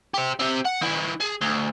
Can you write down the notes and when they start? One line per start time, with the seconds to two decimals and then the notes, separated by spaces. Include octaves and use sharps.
0.14 G4 C5
0.39 C4 G4
0.65 F#5
0.81 D#3 E4
1.20 G#4
1.41 D2